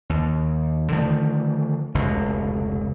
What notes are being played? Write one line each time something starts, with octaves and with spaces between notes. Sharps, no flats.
D#2
D3 D#3 F3 A3
F1 C#2 B2